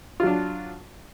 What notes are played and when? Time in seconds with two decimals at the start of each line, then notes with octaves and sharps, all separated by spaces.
0.20 F4
0.23 F#3
0.27 D4